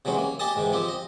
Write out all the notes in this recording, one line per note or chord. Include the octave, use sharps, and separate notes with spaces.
C3 E3 F#3 G#3 C#4
A#3
G4 D#5 G#5 A5 D#6
G#2 D#3 E3
F3 C4 G4
D#5